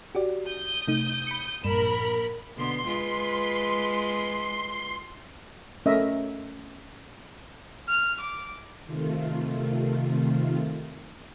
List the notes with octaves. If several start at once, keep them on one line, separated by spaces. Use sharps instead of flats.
F#4 G4 D5
D#6 G6
C3 A3 D#4
B5 C#7
A#1 G2 A#4 B5 E7
B2 D3 B3 C6
G#3 F4 B4
A3 C#4 A#4 D#5 E5
F6
D6
C3 D#3 A3 F4